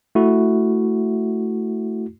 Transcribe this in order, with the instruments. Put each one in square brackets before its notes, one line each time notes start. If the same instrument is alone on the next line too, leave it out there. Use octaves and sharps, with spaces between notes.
[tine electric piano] A3 E4 F#4